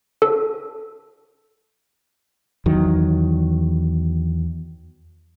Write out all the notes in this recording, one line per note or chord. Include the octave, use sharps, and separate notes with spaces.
A4
E2 D#3 F#3